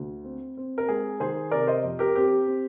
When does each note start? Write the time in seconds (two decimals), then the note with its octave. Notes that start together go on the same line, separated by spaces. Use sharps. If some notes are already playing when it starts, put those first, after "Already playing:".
Already playing: D2
0.24 C4
0.57 C4
0.78 A#4
0.89 G#3 G#4
1.20 D#3 G#4 C5
1.51 C3 A#4 D5
1.67 C5 D#5
1.84 F2
1.99 G4 A#4
2.16 C4 G4
2.47 C4